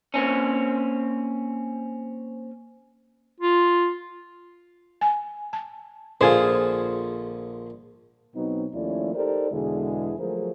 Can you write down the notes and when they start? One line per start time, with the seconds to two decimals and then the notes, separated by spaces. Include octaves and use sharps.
0.14 A#3 C4 C#4
3.40 F4
5.01 G#5
5.53 A5
6.21 A#1 D3 F4 G#4 C5
8.35 B2 F#3 B3 C4 D#4
8.73 D#2 F3 A3 C#4 E4 D5
9.14 D#4 G4 A4 A#4 C5 D5
9.52 E2 B2 D3 G#3 E4 G#4
10.19 F3 F#3 A3 G#4 A#4 C5